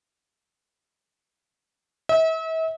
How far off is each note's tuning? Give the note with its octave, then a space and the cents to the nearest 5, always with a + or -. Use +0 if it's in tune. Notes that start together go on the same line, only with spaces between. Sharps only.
E5 -40